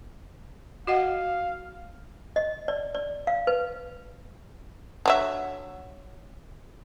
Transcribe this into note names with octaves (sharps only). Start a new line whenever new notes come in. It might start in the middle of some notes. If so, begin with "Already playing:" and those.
F#4 D#5 F5 F#5
D#5
D5
D5
F5
B4
D3 F#3 E5